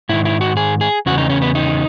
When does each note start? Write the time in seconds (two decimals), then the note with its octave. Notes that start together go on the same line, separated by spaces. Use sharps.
0.09 G#2 D#3 E4
0.25 E4
0.41 F#4
0.57 G#4
0.81 G#4
1.06 E2 C#3 F#4
1.18 D#4
1.30 C#4
1.42 B3
1.55 D#4